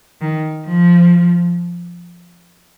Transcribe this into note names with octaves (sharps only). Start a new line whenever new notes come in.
D#3
F3